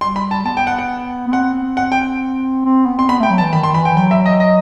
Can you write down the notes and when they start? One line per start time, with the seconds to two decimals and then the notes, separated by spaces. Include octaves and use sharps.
0.01 G3 C6
0.16 B5
0.31 A5
0.45 B3 A5
0.57 G5
0.67 F#5
0.79 F#5
1.28 B3
1.33 C4 F#5
1.77 F#5
1.92 G5
2.65 C4
2.86 B3
2.98 C4 C6
3.08 B3 B5
3.20 A3 G5
3.30 F#3
3.38 A5
3.42 E3
3.53 D#3 B5
3.63 C6
3.74 E3 B5
3.85 G5
3.96 F#3 G5
4.11 E5
4.26 D#5
4.40 D#5